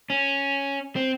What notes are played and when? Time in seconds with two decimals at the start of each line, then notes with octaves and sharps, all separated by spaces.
0.10 C#4
0.96 C4